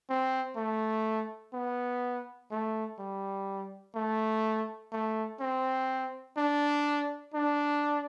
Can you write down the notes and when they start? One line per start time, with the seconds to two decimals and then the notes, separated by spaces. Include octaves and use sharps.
0.09 C4
0.57 A3
1.54 B3
2.51 A3
2.99 G3
3.95 A3
4.92 A3
5.40 C4
6.37 D4
7.34 D4